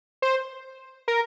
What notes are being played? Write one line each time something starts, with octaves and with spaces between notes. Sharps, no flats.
C5
A#4